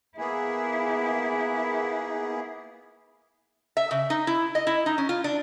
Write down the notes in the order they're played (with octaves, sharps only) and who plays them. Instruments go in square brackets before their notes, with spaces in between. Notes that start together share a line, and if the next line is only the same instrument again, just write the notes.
[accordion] A#3 B3 G#4 [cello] E4
[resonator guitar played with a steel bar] E5
C#3
D#4
E4
D#5
E4
D#4
C#4
F4
D4